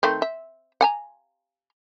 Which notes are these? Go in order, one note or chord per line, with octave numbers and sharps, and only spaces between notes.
D#3 A3 C4
E5
F#5 G#5 A#5